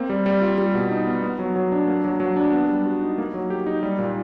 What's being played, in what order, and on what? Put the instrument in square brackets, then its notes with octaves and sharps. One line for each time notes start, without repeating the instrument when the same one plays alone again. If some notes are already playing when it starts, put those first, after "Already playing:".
Already playing: [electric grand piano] A#3 C4
G3
G3
F4
G3
B2
D#4
B3
B3
F#3
F#3
D4
A#3
F#3
F#3
D4
B3
G3
F#4
D#4
A#3
F#3
G4
D#4
G3
A#2